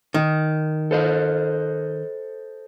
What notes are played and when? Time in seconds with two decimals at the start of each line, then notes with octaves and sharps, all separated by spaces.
0.14 D#3
0.91 A4 C5 D#5